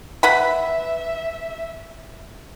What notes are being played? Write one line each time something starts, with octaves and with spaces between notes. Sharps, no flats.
B4 E5 F#5 B5